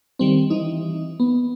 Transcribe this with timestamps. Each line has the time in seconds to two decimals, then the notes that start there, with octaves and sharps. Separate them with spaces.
0.19 D#3 G3 C4
0.50 E3 D#4
1.20 B3